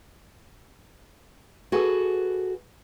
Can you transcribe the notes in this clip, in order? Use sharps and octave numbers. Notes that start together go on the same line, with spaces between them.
F#4 G#4 A4 B4 F#5 G#5